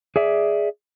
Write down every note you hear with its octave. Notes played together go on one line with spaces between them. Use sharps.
G#4 D5 E5